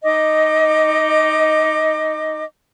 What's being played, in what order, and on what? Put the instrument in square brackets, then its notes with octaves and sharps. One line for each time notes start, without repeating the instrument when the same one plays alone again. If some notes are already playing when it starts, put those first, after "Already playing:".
[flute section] D#4 D#5 D6